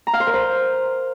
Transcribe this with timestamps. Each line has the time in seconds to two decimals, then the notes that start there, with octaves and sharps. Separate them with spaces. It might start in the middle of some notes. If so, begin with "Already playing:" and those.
0.07 A#5
0.14 F5
0.20 C5
0.27 A#4
0.33 C5